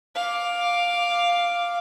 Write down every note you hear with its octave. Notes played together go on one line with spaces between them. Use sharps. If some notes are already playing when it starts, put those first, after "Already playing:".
F5 D6